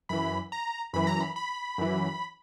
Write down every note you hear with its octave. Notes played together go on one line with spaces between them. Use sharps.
F#2 E3 B5
A#5
F#2 E3 B5
A#5
B5
B5
F#2 E3